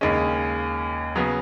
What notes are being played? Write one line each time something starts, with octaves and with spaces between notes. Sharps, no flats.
D#2 C#3 G#3 C#4
C#3 F#3 B3